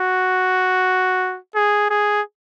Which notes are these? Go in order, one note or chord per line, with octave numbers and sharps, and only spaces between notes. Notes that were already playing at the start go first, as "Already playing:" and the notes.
Already playing: F#4
G#4
G#4